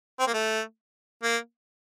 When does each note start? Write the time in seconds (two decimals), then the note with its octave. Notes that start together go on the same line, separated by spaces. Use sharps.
0.19 C4
0.27 A#3
0.34 A3
1.23 A#3